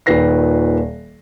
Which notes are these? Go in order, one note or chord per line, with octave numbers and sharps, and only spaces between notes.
D#1 A#2 D#3 B4 A#6 C7